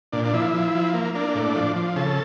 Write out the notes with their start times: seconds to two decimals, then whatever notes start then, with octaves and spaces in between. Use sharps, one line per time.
0.12 A#2 D4
0.25 D4
0.33 F3 E4
0.54 F3
0.75 F3
0.94 A#3
1.15 A#3 D4
1.35 A2
1.56 F3
1.76 F3
1.96 C#3 A4